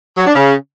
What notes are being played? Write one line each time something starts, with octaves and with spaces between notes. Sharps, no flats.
F#3
D4
C#3